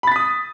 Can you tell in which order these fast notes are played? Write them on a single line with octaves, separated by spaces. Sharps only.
B5 A6 B6 D#6